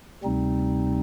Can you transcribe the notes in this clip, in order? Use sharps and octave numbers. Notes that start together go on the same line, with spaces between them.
D2 C3 G3 C4 D#4